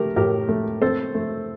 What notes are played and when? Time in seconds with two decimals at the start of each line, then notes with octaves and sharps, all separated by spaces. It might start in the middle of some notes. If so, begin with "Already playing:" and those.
Already playing: A3 G4 A#4
0.16 A2 G4 A#4
0.49 A3
0.82 C4 A4 C5
1.15 A3